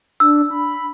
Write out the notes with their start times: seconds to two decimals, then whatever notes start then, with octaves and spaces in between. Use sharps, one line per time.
0.20 D4 E6
0.50 B5